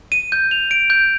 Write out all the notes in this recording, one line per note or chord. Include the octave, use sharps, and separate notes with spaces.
D#7
G6
F7
D7
G6